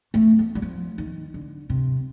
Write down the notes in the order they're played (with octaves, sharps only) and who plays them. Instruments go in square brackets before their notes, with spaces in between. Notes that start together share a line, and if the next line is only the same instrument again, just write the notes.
[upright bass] A3
A3
G3
F3
D#3
D3
C3